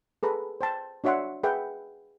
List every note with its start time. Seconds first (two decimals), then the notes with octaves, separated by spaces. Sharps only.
0.23 G#4 A4 B4 A#5
0.61 C5 G5 A5
1.04 D4 F#4 C#5 E5 F#5 C6
1.43 G#4 B4 E5 F#5 G5